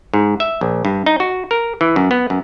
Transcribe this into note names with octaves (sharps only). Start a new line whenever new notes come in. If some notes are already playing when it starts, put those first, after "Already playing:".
G#2
E5
A#1
G2
D#4
F#4
A#4
E3
F#2
B3
F#2